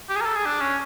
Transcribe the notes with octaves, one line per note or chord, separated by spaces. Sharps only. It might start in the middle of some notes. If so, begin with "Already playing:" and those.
G4
G#4
A#4
A4
G#4
D4
C#4